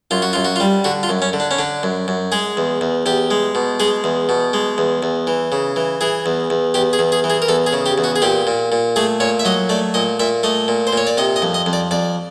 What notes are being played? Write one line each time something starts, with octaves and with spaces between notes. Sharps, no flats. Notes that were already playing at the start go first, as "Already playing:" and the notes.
F#2 F4
F#4
F#2 F4
F#4
F4
G3
D3 F#4
F4
F#2
C#4
D3
D4
C#4
D3 D4
F#2
F#2
G#3 G#4
E2
E2
E2 G4
G#3
B2
G#3 G#4
E2
B2
G#3
E2
E2
E3
C#3
E3
E3 G#4
E2
E2
E2 G4
G#4
E2
G#4
E3
G#4
A#4
E2 A4
G#4
C#3
G4
E2
F#4
G#4
A#2 G4
A#2
A#2
A3 G#4
A#2 C#5
E5
F#3 D#5
A3 D5
A#2 D#5
A#2 E5
A3 D#5
A#2
C5
A#2 C#5
D5
C3 D#5
D#5
F2
D#5
F2
D5
F2 D5